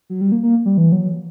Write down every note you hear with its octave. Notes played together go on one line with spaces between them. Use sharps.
F#3
G3
A#3
A#3
G3
E3
F#3